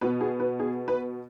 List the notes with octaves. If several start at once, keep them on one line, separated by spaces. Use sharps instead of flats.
B2 B3 B4
G#4
B4
G#4
B4